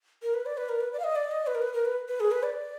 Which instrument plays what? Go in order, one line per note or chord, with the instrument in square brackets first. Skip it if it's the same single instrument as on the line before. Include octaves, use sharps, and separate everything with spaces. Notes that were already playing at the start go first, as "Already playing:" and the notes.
[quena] A#4
B4
D5
B4
A#4
B4
D5
F5
D#5
D5
D#5
B4
A#4
B4
A#4
B4
B4
G#4
B4
D5